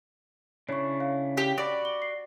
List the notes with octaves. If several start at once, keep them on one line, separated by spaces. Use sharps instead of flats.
C#3 D4 E4 C#5 C#6
C#5 F5
G4
F#4 D5 B5
G7
C7